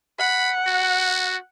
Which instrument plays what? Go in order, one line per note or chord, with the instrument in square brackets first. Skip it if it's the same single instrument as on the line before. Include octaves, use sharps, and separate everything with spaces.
[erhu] F#5 [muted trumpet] B5
[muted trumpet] F#4